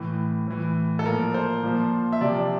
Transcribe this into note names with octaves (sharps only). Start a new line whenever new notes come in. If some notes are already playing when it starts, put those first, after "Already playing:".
Already playing: A2 E3
A2 E3
A4
A#2 F3 A#4
C5
A#2 F3
E5
C3 F3 D5